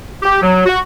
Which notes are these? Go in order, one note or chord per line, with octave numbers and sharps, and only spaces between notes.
G4
F#3
F#4